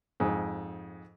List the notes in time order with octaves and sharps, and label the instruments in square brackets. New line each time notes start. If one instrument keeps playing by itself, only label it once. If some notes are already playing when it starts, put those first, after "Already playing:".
[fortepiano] F2 G#2